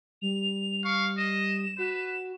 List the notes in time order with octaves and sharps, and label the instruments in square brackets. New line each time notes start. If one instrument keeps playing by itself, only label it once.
[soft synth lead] G3 [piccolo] F7
[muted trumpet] F5 [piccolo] C#6
[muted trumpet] D#5 [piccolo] E7
[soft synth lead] F#4 [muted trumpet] B4